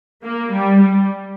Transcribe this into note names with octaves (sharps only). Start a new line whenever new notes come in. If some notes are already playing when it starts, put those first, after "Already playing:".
A#3
G3
G3